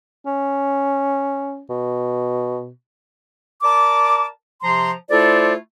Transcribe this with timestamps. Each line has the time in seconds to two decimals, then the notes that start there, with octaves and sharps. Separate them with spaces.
0.26 C#4
1.70 B2
3.64 A#4 D5 A5 D6
4.63 C3 F3 A#5 C6
5.10 A3 E4 F4 A4 C5 D5